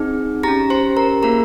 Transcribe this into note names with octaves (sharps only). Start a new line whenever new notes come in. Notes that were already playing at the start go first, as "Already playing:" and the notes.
Already playing: C4 D#4 G#4
C#4 G4 A#5 A#6
C5 C6
A#4 A#5
A#3 F4 G#4 A#4 A#5